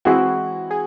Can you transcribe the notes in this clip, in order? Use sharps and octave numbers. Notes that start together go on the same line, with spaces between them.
E3 G#3 C4 E4 F#4 G#4
G#4